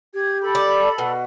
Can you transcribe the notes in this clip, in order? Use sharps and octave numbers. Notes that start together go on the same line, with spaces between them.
G4 G#6
A4 B5
D5
B2 F#5